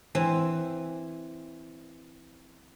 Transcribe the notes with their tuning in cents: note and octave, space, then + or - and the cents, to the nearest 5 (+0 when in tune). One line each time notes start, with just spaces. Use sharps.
E3 +0 C4 +0